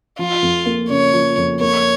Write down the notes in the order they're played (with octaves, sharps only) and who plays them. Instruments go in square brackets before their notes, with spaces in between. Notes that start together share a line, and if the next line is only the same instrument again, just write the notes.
[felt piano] F3 [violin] F4
[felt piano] F2
A#3
[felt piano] C#3 [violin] C#5
[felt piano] F3
F2
[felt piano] A#3 [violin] C#5